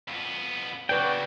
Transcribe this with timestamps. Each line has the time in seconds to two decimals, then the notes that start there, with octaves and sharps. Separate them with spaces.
0.08 F2 B3
0.89 C#3 F#3 F#4 B4 D5 G5